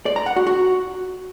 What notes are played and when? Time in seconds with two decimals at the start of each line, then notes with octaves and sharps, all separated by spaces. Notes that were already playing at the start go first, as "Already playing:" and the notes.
0.06 D5
0.16 A#5
0.26 F#5
0.36 F#4
0.47 F#4